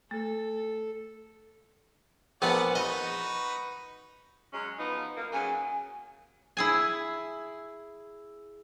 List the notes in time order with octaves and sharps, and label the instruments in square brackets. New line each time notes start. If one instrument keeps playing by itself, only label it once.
[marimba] A3 [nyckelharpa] A4
[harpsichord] A#1 B3 [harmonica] D5 F#5 A5
[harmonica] D#4 F#4 B4 [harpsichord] D#5
[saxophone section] F#3 G#3 C#4
F3 B3 D#4
F#2 A#3
[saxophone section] C#3 F#3 A#3 [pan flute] G#5
[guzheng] E4 G#4 G#5